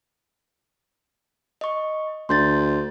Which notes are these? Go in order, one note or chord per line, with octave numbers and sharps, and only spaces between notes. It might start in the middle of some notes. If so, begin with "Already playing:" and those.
D#5 C#6
D2 C6 G6 A6